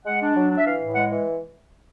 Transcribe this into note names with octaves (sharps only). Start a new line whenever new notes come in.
G#3 F#5
D4
F#3
D4
E5
E3 F5
A2
G#3 F#5
E3